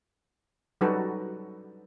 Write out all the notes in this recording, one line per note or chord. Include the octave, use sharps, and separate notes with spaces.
F#3 G3 D#4 F#4 A4 B4